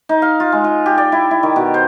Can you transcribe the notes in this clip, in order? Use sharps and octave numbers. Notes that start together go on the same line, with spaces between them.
D#4
F5
F4
G#3
F4
G4
D5
E4
E4
D#3
B2
C5